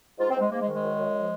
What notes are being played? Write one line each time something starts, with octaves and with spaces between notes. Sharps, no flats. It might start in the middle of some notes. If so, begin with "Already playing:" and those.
G#2 F4
C4
G#2 G#3
G#2 A#3
G#3
D#3
G#3
F#2
F#2
F3